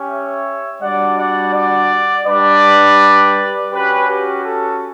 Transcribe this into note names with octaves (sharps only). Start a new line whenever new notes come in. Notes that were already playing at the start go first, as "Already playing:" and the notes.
Already playing: C#4 G4
C#5 E5
G3 D4 F#4 D5 F#5
D5 F#5
D5 F#5
G3 D4 G4 B4 D5
C#4 F#4 G4 B4
G4
A4